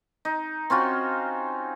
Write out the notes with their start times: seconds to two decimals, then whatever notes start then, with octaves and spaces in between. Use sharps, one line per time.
0.25 D#4
0.70 C4 C#4 F4 F#4